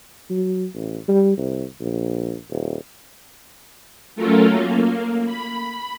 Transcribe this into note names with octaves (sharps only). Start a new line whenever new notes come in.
F#3
A1
G3
C2
A#1
D#1
F#3 A3 C#4 F4 A4 A#4
A#3
B5